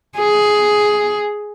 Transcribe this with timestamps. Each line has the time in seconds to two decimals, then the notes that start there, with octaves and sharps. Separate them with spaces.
0.18 G#4